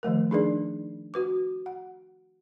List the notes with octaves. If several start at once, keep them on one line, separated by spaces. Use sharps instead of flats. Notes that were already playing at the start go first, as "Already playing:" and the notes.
D#3 F3 A3 A#4
D4 D#4 G#4 A#4 B4 D5
F#4 B4 D6
F#5